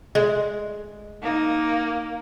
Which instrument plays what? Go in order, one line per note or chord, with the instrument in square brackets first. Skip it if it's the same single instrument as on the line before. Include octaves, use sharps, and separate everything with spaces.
[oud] G#3
[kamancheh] A#3 [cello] D#4